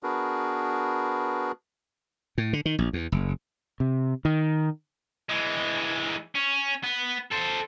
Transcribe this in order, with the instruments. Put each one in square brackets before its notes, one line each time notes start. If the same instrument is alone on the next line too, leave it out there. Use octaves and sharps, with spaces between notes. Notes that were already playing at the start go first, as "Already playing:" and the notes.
[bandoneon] B3 D4 F#4 G#4 A#4 B4
[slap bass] A2
D3
D#3
A#1
E2
F#1
[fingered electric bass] C3
D#3
[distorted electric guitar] E3 G#3
C#4
B3
A4 C5